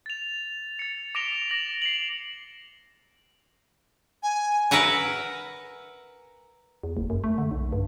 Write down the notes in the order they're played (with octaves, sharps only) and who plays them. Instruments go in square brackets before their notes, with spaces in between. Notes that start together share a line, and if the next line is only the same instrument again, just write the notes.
[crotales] A6 F7
A6 C#7
D6 A#6 D7 E7 F7 G7
A#6 F#7
C7 E7 F#7
[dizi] G#5
[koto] A#4 B4 E5 F#5 G#5
[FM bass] E2
F#1
F#2
A3
D3
B1
G2